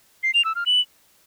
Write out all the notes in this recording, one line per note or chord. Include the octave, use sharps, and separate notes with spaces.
C7
F7
E6
F6
F#7